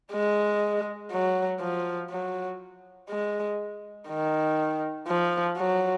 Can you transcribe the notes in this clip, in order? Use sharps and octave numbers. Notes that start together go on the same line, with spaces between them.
G#3
F#3
F3
F#3
G#3
D#3
F3
F#3